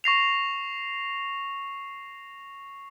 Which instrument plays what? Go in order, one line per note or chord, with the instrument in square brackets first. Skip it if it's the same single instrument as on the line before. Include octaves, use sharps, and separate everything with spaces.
[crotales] C#6 A#6 C7 F7